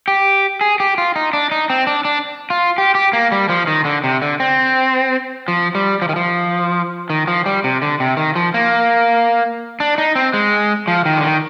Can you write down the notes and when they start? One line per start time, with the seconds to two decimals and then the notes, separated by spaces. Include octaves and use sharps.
0.08 G4
0.61 G#4
0.80 G4
0.98 F4
1.16 D#4
1.33 D4
1.51 D#4
1.70 C4
1.87 D4
2.05 D4
2.50 F4
2.78 G4
2.95 G4
3.13 A#3
3.32 G3
3.49 F3
3.67 D#3
3.85 D3
4.04 C3
4.22 D3
4.40 C4
5.48 F3
5.75 G3
6.02 F3
6.09 D#3
6.16 F3
7.10 D#3
7.28 F3
7.46 G3
7.64 C3
7.82 D3
8.00 C3
8.17 D#3
8.35 F3
8.54 A#3
9.80 D4
9.98 D#4
10.15 C4
10.34 G#3
10.88 F3
11.05 D#3
11.17 D3
11.24 D#3